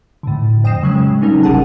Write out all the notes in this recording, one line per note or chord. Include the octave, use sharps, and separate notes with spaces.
A2 D3
F2 G5 D#6 A#6 C7 E7
C#3 F#3 G#3 C#4
C#3 G3 C#4 D#4 A#4
G1 C3 G4 G#4 F#5 A5